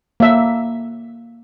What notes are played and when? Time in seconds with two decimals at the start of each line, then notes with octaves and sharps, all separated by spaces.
0.20 A#3 E5